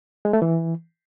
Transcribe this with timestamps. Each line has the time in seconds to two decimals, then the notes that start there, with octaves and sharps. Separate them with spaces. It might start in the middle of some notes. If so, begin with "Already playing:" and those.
0.25 G#3
0.33 A3
0.42 E3